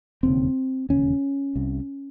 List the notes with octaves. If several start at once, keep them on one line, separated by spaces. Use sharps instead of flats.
E1 D#2 C#3 C4
E1 D#2 C#3 C#4
C2 C3